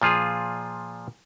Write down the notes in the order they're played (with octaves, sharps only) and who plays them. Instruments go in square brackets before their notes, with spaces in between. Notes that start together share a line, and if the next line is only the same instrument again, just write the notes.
[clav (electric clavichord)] A#2 F3 F4 G#4